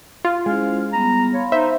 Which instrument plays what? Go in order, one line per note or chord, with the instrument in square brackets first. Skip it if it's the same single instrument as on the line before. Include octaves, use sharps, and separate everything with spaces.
[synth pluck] F4
[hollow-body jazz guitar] G#3 [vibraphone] C#4 E4 C5 [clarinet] F5
[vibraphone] G3 B3 [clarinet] A#5
[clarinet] C#5 [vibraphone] F5 B5 C6
[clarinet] D#4 [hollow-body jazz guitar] C5 [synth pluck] E5